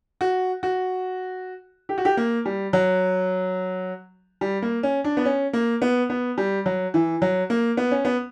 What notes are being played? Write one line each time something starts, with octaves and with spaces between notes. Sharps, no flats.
F#4
F#4
G4
F#4
G4
A#3
G3
F#3
G3
A#3
C#4
D4
B3
C#4
A#3
B3
B3
G3
F#3
E3
F#3
A#3
B3
C#4
B3